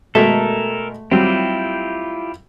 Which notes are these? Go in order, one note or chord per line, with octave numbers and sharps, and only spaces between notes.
B2 G#3 A3 A4 A#4
F#3 G3 C4 E4 F4 G4